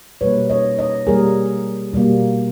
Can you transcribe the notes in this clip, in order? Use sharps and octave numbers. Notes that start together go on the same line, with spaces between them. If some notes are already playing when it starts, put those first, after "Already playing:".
B2 G3 A#3 B4 C#5
C#5 D#5
C#5 D#5
B2 G3 A#3 G#4 A#4
B2 G3 A#3